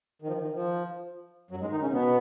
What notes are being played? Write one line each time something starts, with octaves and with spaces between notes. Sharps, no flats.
D#3
F3
D#3
F3
F#2 F#3
G#2 G#3
D#3 D#4
C#3 C#4
B2 B3